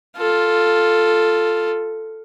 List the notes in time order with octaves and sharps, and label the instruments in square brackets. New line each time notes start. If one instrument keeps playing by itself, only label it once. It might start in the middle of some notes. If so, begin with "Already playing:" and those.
[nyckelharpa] F4 A4